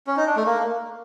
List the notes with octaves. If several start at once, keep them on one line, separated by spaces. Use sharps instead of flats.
C#4
D#4
D4
A3
A#3